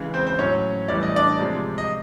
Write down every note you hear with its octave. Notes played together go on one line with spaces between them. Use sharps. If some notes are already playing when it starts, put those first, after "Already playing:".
Already playing: C#3 E3 G#3
C4 C5
C5
A2 F#3 C#4 C#5
A2 E3 G3 D5
D#5
D4 D5
C3 F3 G#3
D#5